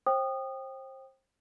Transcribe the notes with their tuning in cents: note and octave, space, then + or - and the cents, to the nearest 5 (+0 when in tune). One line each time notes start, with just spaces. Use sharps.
C5 +30 G5 +0 D#6 -25